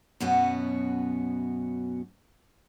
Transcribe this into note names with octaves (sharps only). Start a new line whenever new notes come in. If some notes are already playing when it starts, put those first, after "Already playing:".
F#2 B2 B3 C#4 F#4